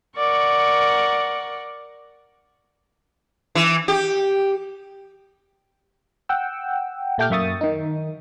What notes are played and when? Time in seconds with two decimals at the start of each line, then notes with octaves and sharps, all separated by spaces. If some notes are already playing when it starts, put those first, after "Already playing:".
0.17 A#4 D5 F#5 C#6
3.55 E3
3.88 G4
6.29 F#5 G5 E6
7.18 A#2 A3 G4 G5 D6 F6
7.30 F#2 A#3 E5 C#6 D#6 A6
7.61 D#3 D#4